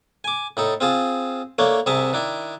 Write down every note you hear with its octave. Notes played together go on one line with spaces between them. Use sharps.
G#5 D6
A2 D#4 A4
C4 F4 G#4 A5
A3 A#3 D4 C#5
C2 C3 G#4 E5 A5 A#5
D#3 D4 E4